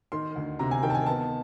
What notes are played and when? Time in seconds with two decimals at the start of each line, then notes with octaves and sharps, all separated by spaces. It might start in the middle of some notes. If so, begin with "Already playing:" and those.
0.12 D#3 C6
0.36 D2
0.59 C3 A#5
0.71 G#5
0.83 D#3 G5
0.90 A5
0.94 G#5
1.06 B3 A5